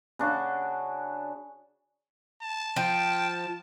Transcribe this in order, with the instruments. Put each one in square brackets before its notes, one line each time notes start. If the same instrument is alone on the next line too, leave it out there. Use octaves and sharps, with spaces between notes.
[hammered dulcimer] C#3 D4 F#4
[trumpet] A5
[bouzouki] F3 [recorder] G5